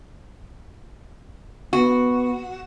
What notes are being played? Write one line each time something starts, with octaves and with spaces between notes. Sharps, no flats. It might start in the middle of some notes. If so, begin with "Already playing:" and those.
B3 F#4